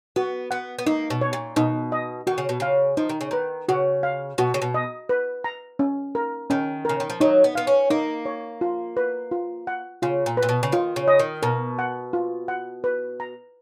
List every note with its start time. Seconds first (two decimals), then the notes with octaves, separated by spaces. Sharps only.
0.16 B3 F#4
0.51 B3 F#5
0.78 B3
0.86 A#3 D#4
1.10 B2
1.21 C#5
1.33 A#2
1.56 B2 D#4
1.92 D#5
2.27 D#3 F#4
2.38 C#3
2.49 B2
2.60 C#3 F5
2.97 F3 D#4
3.09 D#3
3.21 C#3
3.31 D#3 B4
3.69 C#3 F#4
4.03 F5
4.38 B2 F#4
4.54 C#3
4.62 B2
4.74 D#5
5.09 B4
5.44 A#5
5.79 C#4
6.15 A#4
6.50 D#3 C#4
6.85 C#3 A#4
7.00 D#3
7.10 F3
7.20 F#3 D#4
7.44 B3
7.55 B3 F5
7.67 C#4
7.90 A#3 D#4
8.26 C#5
8.61 F4
8.97 B4
9.31 F4
9.67 F#5
10.02 C#3 F4
10.26 A#2
10.37 B4
10.43 A#2
10.49 B2
10.63 C#3
10.72 D#3 F4
10.96 C#3
11.08 D#5
11.19 D#3
11.43 B2 A#4
11.79 F#5
12.13 F4
12.48 F#5
12.84 B4
13.20 A#5